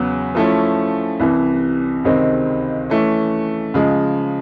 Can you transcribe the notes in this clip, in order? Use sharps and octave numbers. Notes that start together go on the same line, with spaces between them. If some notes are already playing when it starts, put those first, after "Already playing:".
Already playing: E2 C#3 F#3 B3
F3 A3 C#4 E4
C2 C3 E3
C#2 C3 D#3 G#3 C4
E3 A3 C#4
C#3 F3 G#3